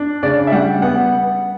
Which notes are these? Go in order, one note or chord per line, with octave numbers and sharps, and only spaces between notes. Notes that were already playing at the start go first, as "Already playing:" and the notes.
Already playing: D4
C#3 D5
E5
G3 F#5
B3 F#5